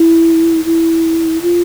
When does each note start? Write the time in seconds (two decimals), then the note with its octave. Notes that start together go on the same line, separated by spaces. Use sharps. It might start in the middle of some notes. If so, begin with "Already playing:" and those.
Already playing: E4
0.65 E4
1.42 F4